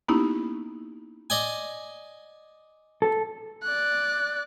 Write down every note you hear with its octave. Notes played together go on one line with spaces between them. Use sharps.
A#3 B3 C#4 D#4 E4 G4
D5 D#5 G#5
A4
D5 F#6